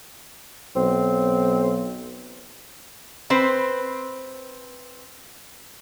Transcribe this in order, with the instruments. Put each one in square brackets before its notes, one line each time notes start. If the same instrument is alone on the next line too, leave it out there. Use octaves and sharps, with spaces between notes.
[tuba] B1 [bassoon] C4
[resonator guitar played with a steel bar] C4 B4 C5